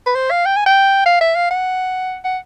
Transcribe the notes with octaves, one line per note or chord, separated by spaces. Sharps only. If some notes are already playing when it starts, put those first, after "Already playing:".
B4
C5
F5
G5
G#5
G5
F5
E5
F5
F#5
F#5